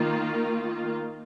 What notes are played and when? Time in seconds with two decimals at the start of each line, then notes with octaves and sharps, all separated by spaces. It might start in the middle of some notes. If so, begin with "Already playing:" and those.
Already playing: D#3 A#3 F4
0.36 A#4